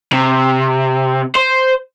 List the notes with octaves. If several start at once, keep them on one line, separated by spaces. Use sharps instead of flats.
C3
C5